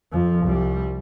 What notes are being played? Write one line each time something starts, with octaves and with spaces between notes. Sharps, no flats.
F2 F3
C2 G3